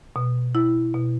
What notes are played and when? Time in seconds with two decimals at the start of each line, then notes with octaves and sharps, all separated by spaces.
0.16 B2
0.55 E4
0.94 B2